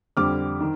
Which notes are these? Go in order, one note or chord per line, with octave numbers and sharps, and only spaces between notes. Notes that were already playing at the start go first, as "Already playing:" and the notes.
F2 D3 G3 D6 F6
D#3